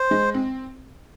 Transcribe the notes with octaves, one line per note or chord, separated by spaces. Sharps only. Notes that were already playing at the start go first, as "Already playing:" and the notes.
Already playing: C5
G#3
C4